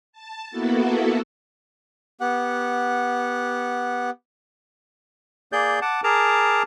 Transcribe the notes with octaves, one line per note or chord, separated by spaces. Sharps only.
A5
A#3 B3 E4 F#4 A4
B3 G4 F#5
A#3 G#4 D5 G6
F#5 A5 D6
G#4 A#4 A5 A#5 D6